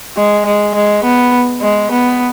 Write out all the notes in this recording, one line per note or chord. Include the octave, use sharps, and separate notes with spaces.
G#3
G#3
G#3
B3
G#3
B3